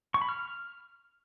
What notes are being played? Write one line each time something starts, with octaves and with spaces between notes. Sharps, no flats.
C#6
B5
F6